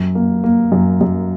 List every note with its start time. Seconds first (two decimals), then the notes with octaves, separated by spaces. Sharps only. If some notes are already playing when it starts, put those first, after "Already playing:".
Already playing: F#2
0.15 A#3
0.44 A#3
0.72 F#2
1.01 F#2